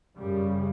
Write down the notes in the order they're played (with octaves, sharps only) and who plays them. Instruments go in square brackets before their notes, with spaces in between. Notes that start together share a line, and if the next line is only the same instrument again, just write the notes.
[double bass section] F#2 C#3 G3